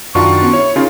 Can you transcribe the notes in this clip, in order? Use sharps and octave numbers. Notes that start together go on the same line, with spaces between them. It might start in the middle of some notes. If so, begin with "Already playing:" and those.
F#2 D#3 D4 F4 F#4 C#6
B3 C#4 F#4
E4 C#5
C#3 C#4 D#4 F4 A#4